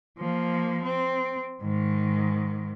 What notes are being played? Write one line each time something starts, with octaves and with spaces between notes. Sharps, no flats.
F3 A#3
C4
G#2 D#3